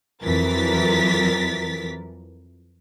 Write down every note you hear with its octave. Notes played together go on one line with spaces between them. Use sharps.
F2 E3 F#3 A#4 A6 B6